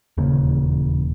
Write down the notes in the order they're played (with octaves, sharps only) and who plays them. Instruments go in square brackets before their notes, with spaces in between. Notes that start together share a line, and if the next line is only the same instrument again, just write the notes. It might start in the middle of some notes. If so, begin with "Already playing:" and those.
[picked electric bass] D#1 E2 C#3 A#3